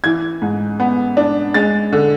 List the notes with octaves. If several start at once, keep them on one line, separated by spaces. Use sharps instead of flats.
E3 G#6
G#2
B3
D4
G#3 A6
D3